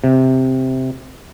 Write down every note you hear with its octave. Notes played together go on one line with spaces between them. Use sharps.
C3